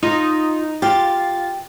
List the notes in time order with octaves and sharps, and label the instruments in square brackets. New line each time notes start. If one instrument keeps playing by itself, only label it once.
[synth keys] D#4 [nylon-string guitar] F4
[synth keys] F4 A6 [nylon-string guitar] G4